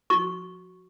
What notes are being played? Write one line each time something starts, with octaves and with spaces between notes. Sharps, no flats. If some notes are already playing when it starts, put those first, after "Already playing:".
F#4 C#6